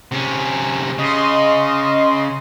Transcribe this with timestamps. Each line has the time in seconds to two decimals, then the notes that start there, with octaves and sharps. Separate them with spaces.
0.12 C3 C#4
0.98 C#3 D#5 C6